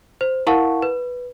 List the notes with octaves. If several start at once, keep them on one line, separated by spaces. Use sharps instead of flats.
C5
E4 A#4 F5 F#5 A5 C#6
B4